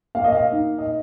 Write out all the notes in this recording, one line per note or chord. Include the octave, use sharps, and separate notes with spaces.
A#3 F5
D#5
F5
D#4
D#5